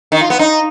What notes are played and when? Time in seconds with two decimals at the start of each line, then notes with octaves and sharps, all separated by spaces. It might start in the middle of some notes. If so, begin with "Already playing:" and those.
0.12 D#3
0.21 F4
0.30 B3
0.39 D#4